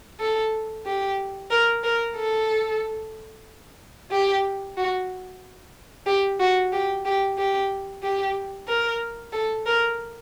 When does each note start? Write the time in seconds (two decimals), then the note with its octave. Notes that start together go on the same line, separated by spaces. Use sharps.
0.20 A4
0.86 G4
1.51 A#4
1.84 A#4
2.16 A4
4.11 G4
4.77 F#4
6.07 G4
6.40 F#4
6.73 G4
7.05 G4
7.38 G4
8.03 G4
8.68 A#4
9.33 A4
9.66 A#4